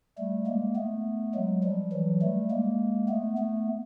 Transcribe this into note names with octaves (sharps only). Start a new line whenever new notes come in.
G3 A3
G#3 A#3
A3 B3
F#3 G#3
F3 G3
E3 F#3
G3 A3
G#3 A#3
A3 B3
A3 B3